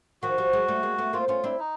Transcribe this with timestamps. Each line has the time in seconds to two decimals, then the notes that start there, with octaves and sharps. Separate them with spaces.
0.23 D#3 F3 F#4
0.38 F3 G3
0.53 F#3 G#3
0.68 G3 A3
0.83 G#3 A#3
0.98 A3 B3
1.13 A#3 C4 F4
1.28 B3 C#4 F4
1.44 C4 D4 E4
1.59 D#4